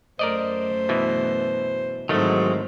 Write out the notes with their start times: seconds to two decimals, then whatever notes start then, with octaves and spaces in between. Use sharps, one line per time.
0.19 F#2 A3 A#4 C5 D5 D#5
0.89 B2 E3
2.09 G#2 D#3 E3 F#3 G#3 A3 C4 C5